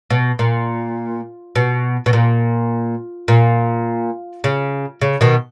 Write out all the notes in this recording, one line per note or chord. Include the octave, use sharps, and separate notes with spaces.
B2
A#2
B2
B2
A#2
A#2
C#3
C#3
B2 D#3